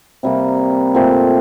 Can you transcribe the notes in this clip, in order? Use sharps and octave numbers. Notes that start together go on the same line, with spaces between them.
C3 G3 A#3
A#2 A3 C4